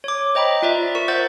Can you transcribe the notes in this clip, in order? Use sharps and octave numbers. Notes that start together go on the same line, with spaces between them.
C#5 D6
C5 D#5 G5 A#5 B5
F4 D5 E5
A#4 C#6
C5 E5 F#5 C#6 G6 A6